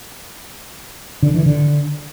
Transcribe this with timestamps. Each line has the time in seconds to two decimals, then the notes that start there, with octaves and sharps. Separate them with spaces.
1.23 D3
1.34 E3
1.46 D3